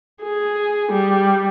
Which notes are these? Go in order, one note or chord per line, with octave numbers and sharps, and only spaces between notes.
G#4
G3